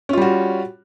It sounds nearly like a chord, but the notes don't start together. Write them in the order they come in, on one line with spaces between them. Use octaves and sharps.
C#4 F4 G3 F#4